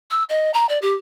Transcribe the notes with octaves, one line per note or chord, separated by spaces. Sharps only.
E6
D#5
A#5
D5
G4